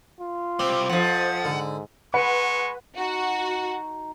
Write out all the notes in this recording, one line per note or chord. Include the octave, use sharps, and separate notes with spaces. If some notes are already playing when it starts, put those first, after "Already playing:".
F4
C3 G3 C4
F2 F3 F#5
G#2 D3
G#3 B4 F#5 C#6
D#4 F#4